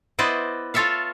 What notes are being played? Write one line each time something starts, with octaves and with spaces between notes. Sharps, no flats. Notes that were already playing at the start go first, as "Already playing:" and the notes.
B3 E4 B4 C5 D5 D#5
F4 A4 C#5 E5 F5